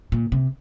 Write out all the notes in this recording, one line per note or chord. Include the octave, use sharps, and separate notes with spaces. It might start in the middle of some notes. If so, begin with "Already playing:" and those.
A#2
C3